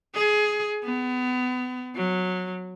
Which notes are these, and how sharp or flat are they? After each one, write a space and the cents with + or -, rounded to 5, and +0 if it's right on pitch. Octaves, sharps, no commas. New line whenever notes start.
G#4 +15
B3 +30
F#3 -15